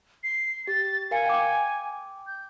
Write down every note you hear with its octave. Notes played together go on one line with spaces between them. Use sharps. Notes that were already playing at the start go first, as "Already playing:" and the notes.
C7
G4 A6
A#4 F5 G#5 C#7
G5 D6
G6